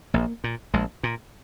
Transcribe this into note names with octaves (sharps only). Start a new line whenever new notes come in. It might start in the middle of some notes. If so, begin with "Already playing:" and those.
A#1 A#3
A#2
A#1 G#3
A#2